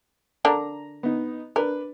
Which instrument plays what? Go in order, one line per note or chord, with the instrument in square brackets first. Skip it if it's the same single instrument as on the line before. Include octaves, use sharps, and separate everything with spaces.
[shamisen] D3 D4 A#4 [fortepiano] A#5
[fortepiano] B3 D#4
[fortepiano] D4 B4 [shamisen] A#4